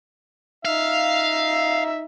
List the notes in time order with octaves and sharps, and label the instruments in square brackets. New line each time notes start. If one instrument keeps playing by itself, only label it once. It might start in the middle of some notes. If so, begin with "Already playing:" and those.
[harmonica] D#4 E5 [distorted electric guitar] F5